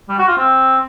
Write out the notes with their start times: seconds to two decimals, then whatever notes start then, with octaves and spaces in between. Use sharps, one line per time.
0.09 G3
0.18 F#4
0.28 F4
0.37 C4